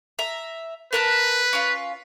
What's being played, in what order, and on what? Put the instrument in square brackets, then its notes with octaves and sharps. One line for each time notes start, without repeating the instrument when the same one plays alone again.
[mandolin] E5 A#5
[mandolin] A#4 A5 F#6 [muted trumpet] B4
[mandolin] C#4 F4